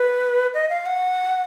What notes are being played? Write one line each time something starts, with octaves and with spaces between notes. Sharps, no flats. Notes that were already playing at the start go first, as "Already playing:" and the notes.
Already playing: B4
D#5
F5
F#5